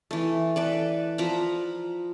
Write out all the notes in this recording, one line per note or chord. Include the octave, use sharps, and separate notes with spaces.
E3 A3
A4 B4 D5
F3 A#5 B5